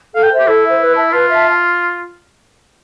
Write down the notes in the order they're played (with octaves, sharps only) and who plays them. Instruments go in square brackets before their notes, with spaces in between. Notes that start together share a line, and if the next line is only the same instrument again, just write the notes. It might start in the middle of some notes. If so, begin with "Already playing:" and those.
[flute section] A4 [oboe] F5
[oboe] G5
[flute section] C5 E5
[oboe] G4
[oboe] E4 [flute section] A4
[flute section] C5 E5
B4
E5 A5
[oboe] F4 [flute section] B4
[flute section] E5 A5